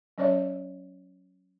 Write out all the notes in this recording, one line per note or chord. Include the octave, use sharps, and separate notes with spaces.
F#3 C#4 C#5 D5 E5